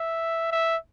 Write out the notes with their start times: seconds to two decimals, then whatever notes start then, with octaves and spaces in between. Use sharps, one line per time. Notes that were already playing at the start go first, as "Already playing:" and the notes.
Already playing: E5
0.52 E5